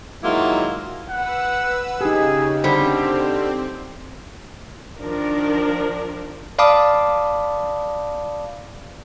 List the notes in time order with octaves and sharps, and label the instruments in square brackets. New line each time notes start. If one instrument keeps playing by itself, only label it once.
[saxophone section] D#3 F#3 G#3 A#3 E4 F4
[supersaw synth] B4 E6 [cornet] F#5
[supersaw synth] C#3 [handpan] D#4 G4 [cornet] G#4
[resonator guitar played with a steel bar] D3 G3 [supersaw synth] C4 [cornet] G4 [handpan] C5
[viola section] D#3 F3 D4 A#4
[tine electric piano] D5 F5 A5 B5 D6 D#6